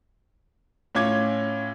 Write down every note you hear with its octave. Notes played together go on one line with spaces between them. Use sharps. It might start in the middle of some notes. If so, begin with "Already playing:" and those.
A2 C#4 F4 D6 G#6